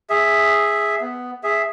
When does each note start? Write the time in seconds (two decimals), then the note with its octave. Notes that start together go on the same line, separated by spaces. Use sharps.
0.10 G#4 E5
1.01 B3
1.43 G#4 E5